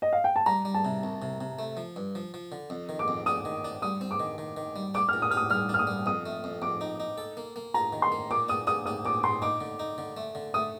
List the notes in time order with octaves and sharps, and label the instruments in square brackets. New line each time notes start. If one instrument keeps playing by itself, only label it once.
[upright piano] D#5
F5
G5
A5
[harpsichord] G3 [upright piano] A#5
[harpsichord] G3
[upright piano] A5
[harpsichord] C3
C2
C3
C3
A3
F3
G2
F3
F3
D3
F2
D#3
[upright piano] D6
[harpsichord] F2
[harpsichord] D4 [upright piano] D#6
[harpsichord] D#3
D4
[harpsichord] G3 [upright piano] D#6
[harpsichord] C4
[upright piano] D6
[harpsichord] D#3
D#3
D#3
G3
[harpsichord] D4 [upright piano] D6
[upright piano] F6
[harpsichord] A#2
[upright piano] D#6
[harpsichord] G4 [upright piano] F6
[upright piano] D#6
[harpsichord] G3 [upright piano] F6
[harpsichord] D4 [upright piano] F6
[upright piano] D#6
[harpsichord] G3
[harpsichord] F2 [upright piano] D#6
[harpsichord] A3
F2
[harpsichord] F2 [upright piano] D6
[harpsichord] D#4
D#4
A4
A#3
A#3
[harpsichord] F4 [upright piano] A#5
[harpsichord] D#3
[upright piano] C6
[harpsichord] A#3
[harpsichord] A#2 [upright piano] D6
[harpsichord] D4 [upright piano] D#6
[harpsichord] D4 [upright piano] D#6
[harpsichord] D4 [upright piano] D#6
[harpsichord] A#2 [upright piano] D6
[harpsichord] A#2 [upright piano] C6
[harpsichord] D#4 [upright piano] D6
[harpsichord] D3
D#4
D3
A3
D3
[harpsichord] A3 [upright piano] D#6